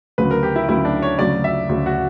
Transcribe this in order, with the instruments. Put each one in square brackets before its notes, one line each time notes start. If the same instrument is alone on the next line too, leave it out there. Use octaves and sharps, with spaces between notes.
[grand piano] D2 C#3 F#3 [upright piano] B4
[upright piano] A#4
G4
E4
[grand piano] D2 C#3 F#3 [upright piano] E4
[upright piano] D4
C#5
[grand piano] D2 C#3 F#3 [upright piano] D5
[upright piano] E5
[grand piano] D2 C#3 F#3
[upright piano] F#4